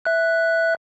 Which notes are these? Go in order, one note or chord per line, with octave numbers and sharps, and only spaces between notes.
E5 F#6